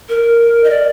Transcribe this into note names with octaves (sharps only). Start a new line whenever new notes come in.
A#4
D#5
D5